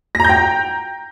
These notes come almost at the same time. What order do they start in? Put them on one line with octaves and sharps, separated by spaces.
A#6 A#5 G6 G5